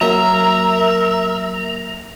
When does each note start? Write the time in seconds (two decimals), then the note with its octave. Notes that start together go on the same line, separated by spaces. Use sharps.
0.01 F#3 A#3 A#4 E5 A#5